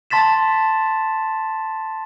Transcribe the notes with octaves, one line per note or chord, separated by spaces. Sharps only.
A5 C6 A6 B6 E7